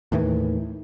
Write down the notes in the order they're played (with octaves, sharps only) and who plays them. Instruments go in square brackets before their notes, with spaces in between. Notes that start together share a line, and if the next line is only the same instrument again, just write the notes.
[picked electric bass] D#2 A2 D#3 E3